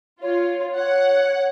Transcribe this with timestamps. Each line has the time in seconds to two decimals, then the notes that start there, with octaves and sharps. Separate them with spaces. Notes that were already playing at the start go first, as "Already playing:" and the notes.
0.22 F4 C#5
0.75 C#5 F#5